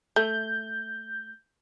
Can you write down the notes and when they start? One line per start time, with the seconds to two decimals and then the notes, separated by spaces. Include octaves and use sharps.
0.16 A3 G6